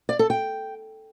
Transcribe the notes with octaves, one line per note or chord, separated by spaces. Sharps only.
D5
A4
G5